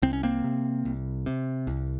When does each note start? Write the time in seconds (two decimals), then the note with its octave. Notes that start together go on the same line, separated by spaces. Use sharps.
0.02 C2 C4
0.13 C#4
0.23 A#3 C4
0.44 C3
0.85 C2
1.26 C3
1.67 C2